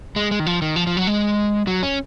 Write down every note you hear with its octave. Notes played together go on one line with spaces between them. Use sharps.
G#3
G#3
D#3
F3
D#3
F3
F3
F#3
G#3
F#3
C#4